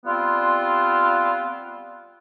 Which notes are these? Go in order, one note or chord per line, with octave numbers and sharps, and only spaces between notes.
G3 B3 C4 F4